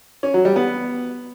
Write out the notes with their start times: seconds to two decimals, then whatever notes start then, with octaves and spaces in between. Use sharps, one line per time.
0.23 C#4
0.34 F#3
0.45 G3
0.56 B3